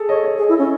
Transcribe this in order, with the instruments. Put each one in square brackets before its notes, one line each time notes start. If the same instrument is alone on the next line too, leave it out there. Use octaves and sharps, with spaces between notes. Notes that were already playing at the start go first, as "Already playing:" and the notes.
Already playing: [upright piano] G#4 A4
[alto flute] C#5 [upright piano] D#5
[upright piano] C#5
[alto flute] G#4
E4
C#4